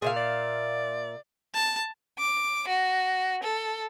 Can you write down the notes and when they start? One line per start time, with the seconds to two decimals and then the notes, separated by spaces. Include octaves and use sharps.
0.02 A#2 G#4 E5 F5
0.17 D5
1.54 A5
2.19 D6
2.67 F#4
3.43 A4